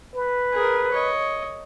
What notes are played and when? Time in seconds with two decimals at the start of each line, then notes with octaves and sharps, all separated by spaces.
0.15 B4
0.53 G#4 A#4
0.92 C#5 D#5